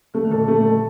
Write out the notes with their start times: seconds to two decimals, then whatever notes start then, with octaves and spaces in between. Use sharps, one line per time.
0.14 D3 F3 A3
0.25 D#3
0.31 A#2 D3 A4
0.48 A#2 A3
0.65 A4